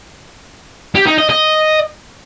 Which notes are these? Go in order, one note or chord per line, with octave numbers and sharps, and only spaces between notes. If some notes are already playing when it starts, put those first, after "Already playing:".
G4
D#4
D#5
D#5